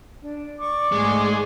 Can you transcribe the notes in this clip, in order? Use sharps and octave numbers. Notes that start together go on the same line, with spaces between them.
D4
D5 C#6 D6
G#2 G#3 A3 G#4